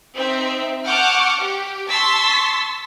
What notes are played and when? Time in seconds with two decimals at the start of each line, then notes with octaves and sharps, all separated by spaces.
0.16 C4 D#4 E5
0.86 F#5 A5 C#6 D6 F6 G6
1.41 G4
1.90 A5 C6 C#6 E6 A6 B6